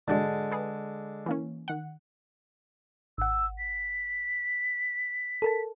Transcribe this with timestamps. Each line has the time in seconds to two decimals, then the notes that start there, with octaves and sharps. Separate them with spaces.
0.08 G#2 D3 G#3 D4 F#4
0.51 G#4 B4
1.26 E3 A#3 C#4
1.68 D#3 F#5
3.18 G#1 F#5 E6
3.58 B6
5.42 A4 A#4 A5